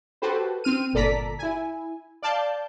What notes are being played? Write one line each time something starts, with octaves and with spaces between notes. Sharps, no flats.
F#4 G4 A4 B4 C5
C4 F6 D#7
G1 A#2 A4 D5 A#5 B6
E4 G#5
D5 F5 A5 G6